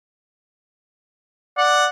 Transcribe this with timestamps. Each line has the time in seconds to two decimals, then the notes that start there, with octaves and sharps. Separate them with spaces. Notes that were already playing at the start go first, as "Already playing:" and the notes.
1.58 D5 F#5